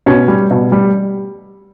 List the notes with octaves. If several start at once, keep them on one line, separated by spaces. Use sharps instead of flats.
B2 C#4
G3
B2
G3